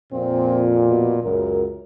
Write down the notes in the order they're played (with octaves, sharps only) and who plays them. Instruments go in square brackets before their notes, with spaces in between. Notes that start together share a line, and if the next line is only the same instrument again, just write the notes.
[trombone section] F2 A#2 [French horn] C4
[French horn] B2
[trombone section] C#2 F#2 [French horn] A#4